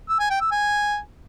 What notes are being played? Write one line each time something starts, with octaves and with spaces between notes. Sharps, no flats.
E6
G#5
G5
E6
G#5